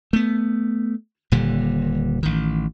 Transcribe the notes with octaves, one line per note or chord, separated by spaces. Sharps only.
A3 B3
D#1 A#2 D3 G3
A1 D#3